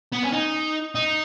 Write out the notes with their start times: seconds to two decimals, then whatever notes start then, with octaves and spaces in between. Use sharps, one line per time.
0.12 B3
0.23 C#4
0.33 D#4
0.95 D#4